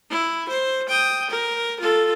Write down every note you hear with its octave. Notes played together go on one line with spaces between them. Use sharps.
E4
C5
G5 D#6
A#4
F4 A4